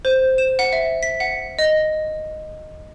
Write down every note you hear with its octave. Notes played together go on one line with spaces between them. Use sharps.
C5
E7
F#5
E5
B6
F#5
D#5